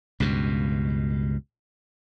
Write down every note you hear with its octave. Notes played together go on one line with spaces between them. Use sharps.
C#2 G2 B2